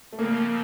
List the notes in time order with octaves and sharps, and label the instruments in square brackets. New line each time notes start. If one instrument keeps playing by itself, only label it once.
[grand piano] A3
[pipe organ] C#3 F3 C4 [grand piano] A#3